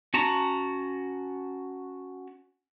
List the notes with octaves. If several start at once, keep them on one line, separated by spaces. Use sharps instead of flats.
C#4 F#4 A5 A#5